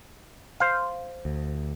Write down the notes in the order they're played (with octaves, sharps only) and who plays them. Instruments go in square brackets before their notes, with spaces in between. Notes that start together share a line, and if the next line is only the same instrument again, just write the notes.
[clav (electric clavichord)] C5 F5
[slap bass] D2